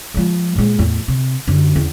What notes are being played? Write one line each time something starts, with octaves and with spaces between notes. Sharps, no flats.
F3 G#3
A#2 G#3
E2 A2
C3
F#2 D3
E2 C#4